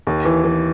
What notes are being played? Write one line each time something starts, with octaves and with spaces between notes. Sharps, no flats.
D#2
E3
E3